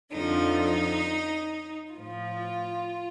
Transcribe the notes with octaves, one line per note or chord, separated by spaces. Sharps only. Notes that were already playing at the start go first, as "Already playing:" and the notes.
F2 D3 F3 D#4
A2 F3 F4